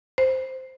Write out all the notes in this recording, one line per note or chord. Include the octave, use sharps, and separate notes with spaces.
C5